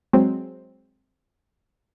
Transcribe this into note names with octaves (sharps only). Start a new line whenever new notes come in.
F#3 G#3 C4